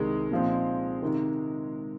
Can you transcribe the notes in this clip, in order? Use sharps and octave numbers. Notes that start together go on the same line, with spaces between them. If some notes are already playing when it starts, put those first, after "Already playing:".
Already playing: C2 C3 D#3 G#3
A#2 F3 C4
C3 D#3